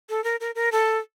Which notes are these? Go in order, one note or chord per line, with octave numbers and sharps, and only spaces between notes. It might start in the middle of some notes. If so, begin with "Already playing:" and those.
A4
A#4
A#4
A#4
A4